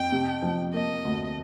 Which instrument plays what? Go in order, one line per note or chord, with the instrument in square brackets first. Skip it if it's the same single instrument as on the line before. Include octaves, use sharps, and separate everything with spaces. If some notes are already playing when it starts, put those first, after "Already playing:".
Already playing: [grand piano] F2 [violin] G5
[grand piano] C3
F3
[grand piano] A#3 [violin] D#5
[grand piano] D2